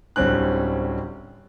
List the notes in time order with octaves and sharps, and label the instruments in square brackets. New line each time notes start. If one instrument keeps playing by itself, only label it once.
[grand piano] D1 D3 G3 C4 C#4 F#6